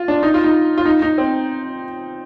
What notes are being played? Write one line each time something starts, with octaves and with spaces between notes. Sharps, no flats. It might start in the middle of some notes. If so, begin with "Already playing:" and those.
Already playing: F4
D4
D#4
F4
D#4
F4
D#4
D#4
C4